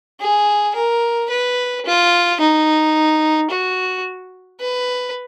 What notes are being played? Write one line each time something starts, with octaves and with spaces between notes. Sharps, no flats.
G#4
A#4
B4
F4
D#4
F#4
B4